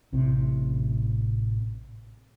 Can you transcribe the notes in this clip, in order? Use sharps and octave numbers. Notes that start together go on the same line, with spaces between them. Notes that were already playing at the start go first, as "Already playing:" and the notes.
A1 A2 C3